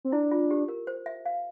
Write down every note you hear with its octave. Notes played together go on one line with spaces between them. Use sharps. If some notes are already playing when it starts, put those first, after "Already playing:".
C4
D4 E4
F4
G4
A#4
C5
E5
F5